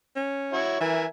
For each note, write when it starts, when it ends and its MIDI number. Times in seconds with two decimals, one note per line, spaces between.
0.16 0.61 61
0.53 0.79 64
0.53 0.79 66
0.53 0.79 73
0.80 1.06 52
0.80 1.05 70
0.80 1.05 76
0.80 1.05 80